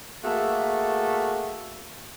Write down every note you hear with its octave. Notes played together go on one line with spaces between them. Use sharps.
A3 A#3 F#4 G#4 A4 E5